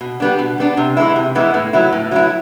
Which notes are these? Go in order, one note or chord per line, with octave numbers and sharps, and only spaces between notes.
B2
G3 B3 D4
B2
G3 B3 D4
C3
E3 G#3 B3 E4
C3
E3 G#3 B3 E4
A2
F#3 B3 E4
A2
F#3 B3 E4